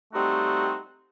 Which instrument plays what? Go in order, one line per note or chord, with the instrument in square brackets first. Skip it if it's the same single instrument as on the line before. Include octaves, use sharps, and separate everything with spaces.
[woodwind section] G3 A3 C4 D#4 F#4